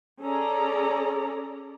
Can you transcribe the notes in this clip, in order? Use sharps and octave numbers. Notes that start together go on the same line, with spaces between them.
C#4 G#4 A4 D5 A#5